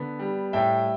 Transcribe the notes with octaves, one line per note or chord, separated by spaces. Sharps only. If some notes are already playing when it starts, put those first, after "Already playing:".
Already playing: D3 B3
G3
A2 E5 G5